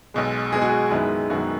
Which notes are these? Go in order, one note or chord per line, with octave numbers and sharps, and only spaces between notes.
B1 B2 G#3
B1 B2 G#3 G#4
F#4
G#4
F#1 F#2 D#3 G#3 B3 E4
F#1 F#2 D#3 G#3 B3 F#4